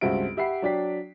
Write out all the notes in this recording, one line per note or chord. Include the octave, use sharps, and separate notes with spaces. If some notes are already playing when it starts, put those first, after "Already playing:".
C#2 G2 C4 F#4 E5 D7
G4 E5 F#5 B5 C7
F#3 D4 D5 G5 B6